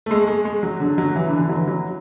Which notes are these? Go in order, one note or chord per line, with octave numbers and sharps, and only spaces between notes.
A3
G#3
G#3
G#3
F#3
D3
F#3
E3
D3
E3
D3
F#3
E3
F#3